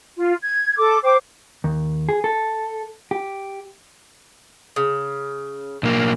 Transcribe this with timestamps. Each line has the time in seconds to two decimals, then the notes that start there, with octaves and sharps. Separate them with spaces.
0.17 F4
0.43 G#6
0.77 A4 D6
1.04 C5 G5 D6
1.64 D#2
2.09 G#4
2.24 A4
3.11 G4
4.76 C#3
5.83 B1 A#3